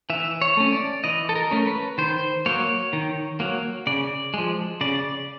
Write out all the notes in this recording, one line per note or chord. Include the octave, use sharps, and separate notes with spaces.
E3 E5
C#5
A3 C#4
D5
E3 D#5
A4
A#4
A3 C#4
B4
D#3 C5
F#3 A#3 C#5
D#3
F#3 A#3
C#3 D5
F3 G#3
C#3 D5